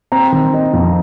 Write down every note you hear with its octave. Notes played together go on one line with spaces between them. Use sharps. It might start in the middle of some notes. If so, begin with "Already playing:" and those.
C4 A#5
D#3
D#4
F2